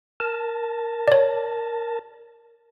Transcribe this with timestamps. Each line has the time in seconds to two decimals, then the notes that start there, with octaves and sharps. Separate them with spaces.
0.20 A#4 A5
1.08 C#5 D5